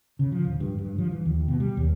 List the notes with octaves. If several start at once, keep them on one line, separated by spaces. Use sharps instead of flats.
C#3
F3
D1
G2
G2
F3
E3
D#2
B2
G3
D#2